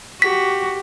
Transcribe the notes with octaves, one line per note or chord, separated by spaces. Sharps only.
F#4 G4 B6